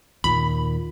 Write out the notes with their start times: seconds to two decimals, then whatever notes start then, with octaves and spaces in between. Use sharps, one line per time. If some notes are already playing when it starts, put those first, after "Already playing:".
0.24 D#2 A#2 B5